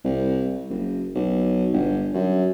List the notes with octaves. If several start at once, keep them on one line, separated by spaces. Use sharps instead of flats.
C2
F#1
B1
G1
F#2